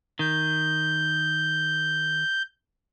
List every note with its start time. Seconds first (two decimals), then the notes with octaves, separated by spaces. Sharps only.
0.19 D#3 G6